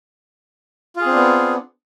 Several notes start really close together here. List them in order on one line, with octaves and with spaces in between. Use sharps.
F4 G#4 C4 D4 B3